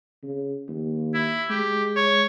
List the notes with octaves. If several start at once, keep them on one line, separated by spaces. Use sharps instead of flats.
C#3
D#2
E4
G#3 G4
C#5